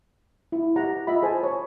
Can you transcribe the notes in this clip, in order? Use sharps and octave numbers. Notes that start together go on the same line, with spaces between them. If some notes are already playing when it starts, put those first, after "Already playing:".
E4
G4 F#5 A#5
F4 D#5 E5 F#5 B5
G#4 C5 G#5 A5
C#5 B5